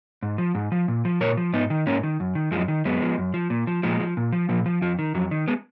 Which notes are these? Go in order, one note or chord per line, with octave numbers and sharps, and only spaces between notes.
G#2
F3
G#2
F3
A#2
F3
A#2 A#4 C#5
F3
G#2 B3 D#4
D#3
G#2 A#3 C#4
D#3
F#2
D#3
F#2 F3 G#3
D#3
F#2 G#3 B3
F3
F#2
F3
A#2
F3
A#2 F3 G#3
F3
A#2
F3
A#2 F3
F3
F2 F3
D#3
F2 F#3
D#3
G#3 B3